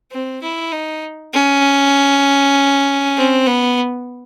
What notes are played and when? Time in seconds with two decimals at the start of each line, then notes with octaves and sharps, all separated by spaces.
0.12 C4
0.42 E4
0.72 D#4
1.33 C#4
3.16 C4
3.47 B3